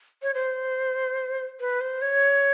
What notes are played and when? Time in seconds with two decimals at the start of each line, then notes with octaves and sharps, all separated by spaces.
0.22 C#5
0.34 C5
1.60 B4
1.81 C5
2.02 C#5